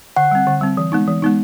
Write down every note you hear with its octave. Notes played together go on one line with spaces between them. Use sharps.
D3 F#5
G3 C4
D3
G3 C4
E3
G#3 B3 D#4
E3
G#3 B3 D#4